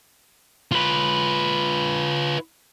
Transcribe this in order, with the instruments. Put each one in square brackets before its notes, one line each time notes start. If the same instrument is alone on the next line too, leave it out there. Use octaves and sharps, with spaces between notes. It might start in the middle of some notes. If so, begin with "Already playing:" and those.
[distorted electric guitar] F4 B4